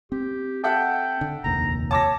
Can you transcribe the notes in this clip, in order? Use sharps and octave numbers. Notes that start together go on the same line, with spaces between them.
C4 G4
A4 E5 F#5 G5
D3
F1 A#1 D#2 A#5
C#5 A5 D6 A#6